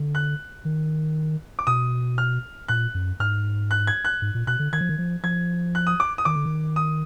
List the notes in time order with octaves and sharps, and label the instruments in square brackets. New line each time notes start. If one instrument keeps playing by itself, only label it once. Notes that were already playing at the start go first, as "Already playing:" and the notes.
Already playing: [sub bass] D3
[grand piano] F#6
[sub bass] D#3
[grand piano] D6
[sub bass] B2 [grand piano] D#6
[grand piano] F6
[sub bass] A#2 [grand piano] F#6
[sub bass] F#2
[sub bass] G#2 [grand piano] F6
[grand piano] F#6
G#6
F#6
[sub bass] G#2
A#2
[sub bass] B2 [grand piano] F#6
[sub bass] D3
[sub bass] D#3 [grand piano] G#6
[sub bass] F3
D#3
F3
[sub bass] F3 [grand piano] G#6
[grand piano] F#6
D#6
D6
D#6
[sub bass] D#3 [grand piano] D6
[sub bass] D3
D#3
[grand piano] D#6